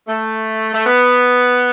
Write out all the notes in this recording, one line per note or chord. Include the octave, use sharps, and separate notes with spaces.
A3
A3
B3